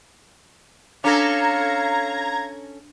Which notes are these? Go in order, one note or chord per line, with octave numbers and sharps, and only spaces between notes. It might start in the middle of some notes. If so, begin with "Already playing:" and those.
C#4 D4 A4 F5 A#5 G#6